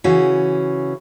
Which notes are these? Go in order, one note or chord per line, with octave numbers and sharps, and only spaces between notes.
C#3 E3 C#4 F#4